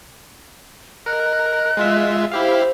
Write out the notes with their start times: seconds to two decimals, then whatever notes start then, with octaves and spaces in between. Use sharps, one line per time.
1.06 A#4 D#5 F#6
1.77 G#3 F4 E5
2.32 E4 G4 C5 F5